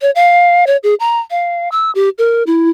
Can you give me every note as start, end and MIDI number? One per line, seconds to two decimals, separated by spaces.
0.02 0.11 73
0.15 0.65 77
0.67 0.77 73
0.83 0.95 68
1.00 1.20 82
1.31 1.69 77
1.72 1.91 88
1.95 2.09 67
2.18 2.43 70
2.47 2.70 64